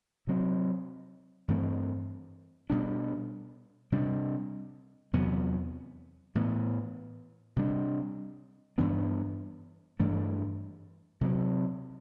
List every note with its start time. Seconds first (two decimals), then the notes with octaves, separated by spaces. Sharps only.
0.27 C3 F#3 C4
1.48 G2 E3 A3 C4
2.70 B2 G3 D4
3.92 C3 G3 D4
5.13 E2 C3 F#3 B3
6.35 A2 E3 B3
7.56 C3 G3 D4
8.78 G2 E3 B3 D4
10.00 G2 E3 A3 D4
11.21 C3 F#3 C4